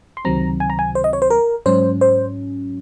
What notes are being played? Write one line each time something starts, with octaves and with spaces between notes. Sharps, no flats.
C6
C#2 C3 D#3 F#3 C4 A#5
G#5
A#5
G#5
C5
D#5
C#5
C5
A#4
G#2 F#3 C#4 C5
C5